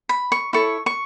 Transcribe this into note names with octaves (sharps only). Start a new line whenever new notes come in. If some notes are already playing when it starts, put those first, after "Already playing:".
B5
C#6
E4 A4 C#5 C#6
C#6